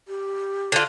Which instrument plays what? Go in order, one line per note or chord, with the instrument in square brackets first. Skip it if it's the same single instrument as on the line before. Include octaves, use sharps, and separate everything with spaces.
[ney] G4
[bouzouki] D3 F4